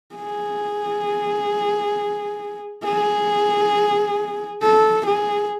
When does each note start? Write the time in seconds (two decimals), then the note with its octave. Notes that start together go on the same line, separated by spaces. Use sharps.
0.15 G#4
2.84 G#4
4.62 A4
5.06 G#4